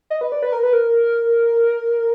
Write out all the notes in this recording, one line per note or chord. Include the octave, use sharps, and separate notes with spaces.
D#5
B4
D5
B4
A#4
B4
A#4